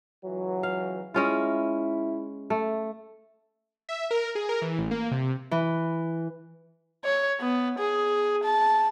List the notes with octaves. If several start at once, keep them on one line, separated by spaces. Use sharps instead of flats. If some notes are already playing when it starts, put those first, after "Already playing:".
C#2 E3 F#3
F5
G#3 C#4 E4 F4
A3
E5
A#4
G#4
A#4
E3
A1
A#3
C3
E3
C#5
B3
G#4
A5